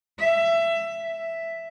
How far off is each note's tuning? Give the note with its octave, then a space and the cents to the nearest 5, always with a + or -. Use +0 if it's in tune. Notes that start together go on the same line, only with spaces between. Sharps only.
E5 +20
E5 +5